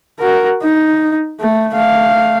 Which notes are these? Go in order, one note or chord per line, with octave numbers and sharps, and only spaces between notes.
F#4 A#4
D#4
A3
A3 F5